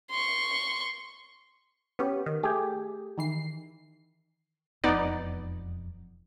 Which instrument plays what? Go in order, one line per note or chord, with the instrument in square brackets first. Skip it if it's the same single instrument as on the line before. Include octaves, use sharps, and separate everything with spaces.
[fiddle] C6 C#6
[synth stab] B3 C#4 G4
D#3
[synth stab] A3 [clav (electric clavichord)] G4 G#4
[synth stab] D#3 E3 C7
[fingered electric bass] E1 F2 [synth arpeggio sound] B3 D#4 D5